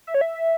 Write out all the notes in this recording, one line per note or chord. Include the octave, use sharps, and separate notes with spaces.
E5
C#5
E5